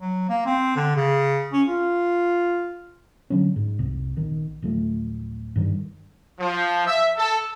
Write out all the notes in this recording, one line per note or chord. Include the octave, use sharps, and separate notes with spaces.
F#3
A#3
C4
D3
C#3
C#4
F4
D3 F#3 C#4
G#2
F1 C2
A#1 D#3
D1 F3 A3
G2 D#3 G3
F3
E5
A4